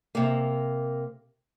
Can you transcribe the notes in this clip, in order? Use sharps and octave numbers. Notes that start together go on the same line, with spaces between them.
C3 A#3